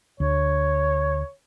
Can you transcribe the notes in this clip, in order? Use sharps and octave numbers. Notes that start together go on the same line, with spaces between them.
D2 C#5